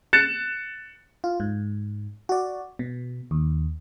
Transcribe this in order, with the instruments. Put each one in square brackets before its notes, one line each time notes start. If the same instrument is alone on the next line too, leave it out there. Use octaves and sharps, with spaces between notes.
[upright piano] F#6 A6 C#7 E7
[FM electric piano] F4
G#2
F#4 D5
B2
D#2